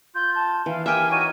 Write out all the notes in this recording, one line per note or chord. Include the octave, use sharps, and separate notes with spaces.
F4 G6
A5
E3 F5
G4 A#4 E5 G5 G#5
D#4 F#4 C#5 D#7